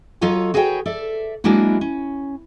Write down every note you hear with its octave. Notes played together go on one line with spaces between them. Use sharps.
F#3 F4 A4 C#5 D#5
F#4 G#4 B4 C#5 D#5 G5
A4 D5 E5
F#3 G#3 A#3 D4 E4 F#4
C#4